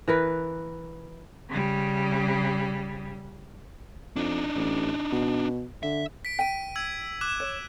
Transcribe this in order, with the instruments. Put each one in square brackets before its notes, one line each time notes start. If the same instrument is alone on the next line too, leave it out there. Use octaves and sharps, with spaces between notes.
[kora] E3 A#4 B4
[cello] C#3 G3
[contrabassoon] F2 [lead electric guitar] D4 D#4
[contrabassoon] A1
B2
[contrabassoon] D3 [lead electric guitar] E5
[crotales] B6 D7
[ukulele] G5 [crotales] B6 D7 D#7
[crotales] E6 G#6
D6 F#6 E7
[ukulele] C#5